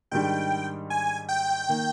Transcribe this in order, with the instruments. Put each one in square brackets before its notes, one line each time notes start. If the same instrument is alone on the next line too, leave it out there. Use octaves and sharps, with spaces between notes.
[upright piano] G#2 D#3 G3 D4 [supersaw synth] G5
[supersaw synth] G#5
G5
[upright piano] D#3 A#3